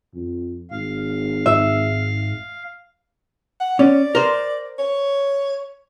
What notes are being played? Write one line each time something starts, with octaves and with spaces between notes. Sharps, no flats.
F2
G#1 F5
G#2 E5
F#5
C#4 D5
A#4 C5
C#5